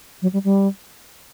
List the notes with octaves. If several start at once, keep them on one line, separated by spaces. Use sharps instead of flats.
F#3
G3
G3